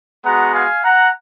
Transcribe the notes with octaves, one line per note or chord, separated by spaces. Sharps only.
G#3 B3 F#4 F#5 A#5
F5 G#5
F#5 A#5